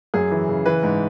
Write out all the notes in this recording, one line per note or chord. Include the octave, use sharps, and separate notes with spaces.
F#2 G#4
E3
C#3
E3 B4
G#2